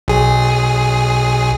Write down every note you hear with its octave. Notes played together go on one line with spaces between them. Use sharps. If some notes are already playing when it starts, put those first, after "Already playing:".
B1 G#4